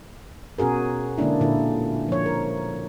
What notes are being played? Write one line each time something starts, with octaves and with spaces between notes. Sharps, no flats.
B2 C#4 F#4 G#4 A#4
D3 G#3 A#3 C#4 D4 E4
A#2 D3 E4
F3 C#5
A#4